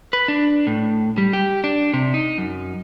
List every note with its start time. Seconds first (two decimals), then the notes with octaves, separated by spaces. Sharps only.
0.13 B4
0.28 D4
0.67 A2
1.18 G3
1.33 G4
1.64 D4
1.94 C3
2.14 D#4
2.38 F#2